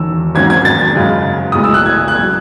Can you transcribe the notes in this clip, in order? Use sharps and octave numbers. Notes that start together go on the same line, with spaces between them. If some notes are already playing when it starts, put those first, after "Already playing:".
Already playing: E1 E2 D#3 E6
G#1 G#2 F#3 C#4 G#6
G#6
A6
F#2 C#3 G#3
B1 A2 G#3 D#6
E6
F#6
G#6
F#6
F#3 G#6